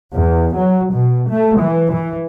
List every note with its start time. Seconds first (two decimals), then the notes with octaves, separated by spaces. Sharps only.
0.13 E2
0.56 F#3
0.91 B2
1.29 A3
1.59 E3
1.92 E3